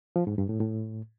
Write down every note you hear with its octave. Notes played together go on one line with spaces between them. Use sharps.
F3
G#2
G2
A2
A2